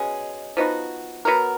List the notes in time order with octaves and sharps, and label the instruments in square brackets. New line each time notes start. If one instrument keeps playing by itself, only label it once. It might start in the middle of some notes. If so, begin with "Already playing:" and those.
Already playing: [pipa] B2 G#3 C#4 G#4
F3 B3 D#4 F#4
F#3 B3 F#4 A#4